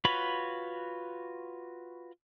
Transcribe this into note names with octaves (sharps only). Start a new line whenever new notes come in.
F4 F#4 B4 C#5 B5